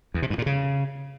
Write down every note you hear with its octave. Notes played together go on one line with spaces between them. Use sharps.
E2
C3
G2
A#2
C#3